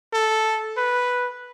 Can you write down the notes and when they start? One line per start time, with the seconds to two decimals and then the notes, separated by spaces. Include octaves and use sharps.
0.13 A4
0.77 B4